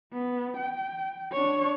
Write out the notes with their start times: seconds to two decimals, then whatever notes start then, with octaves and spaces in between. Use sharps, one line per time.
0.13 B3
0.57 G5
1.33 D4 C#5